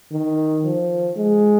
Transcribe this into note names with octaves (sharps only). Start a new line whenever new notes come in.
D#3
F3
G#3